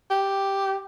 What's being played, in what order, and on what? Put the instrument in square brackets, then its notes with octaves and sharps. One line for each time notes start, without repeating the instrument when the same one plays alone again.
[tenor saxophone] G4